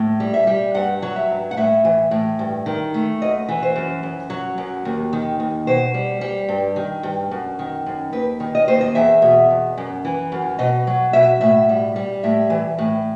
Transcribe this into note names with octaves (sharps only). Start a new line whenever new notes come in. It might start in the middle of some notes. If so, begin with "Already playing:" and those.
Already playing: A2
G3
E5
G3
G2 F#5
F#3
E5
G2
F#5
A2 E5
E3
A2
G2
D#3
A3
F#2 D#5
E3
C5
F#2
F#2
F#3
F#2
D#2
D#3
D#2
B2 C5
G3
G3
G2
D#3
G2
F#2
D#3
F#2
D#2 B4
D#3
D#5
D#2 C5
D#5
E2 E5
B2
E2
F#2
E3
F#2
B2 D#5
F#3
B2 E5
A2 E5
G3
G3
A2 E5
E3
A2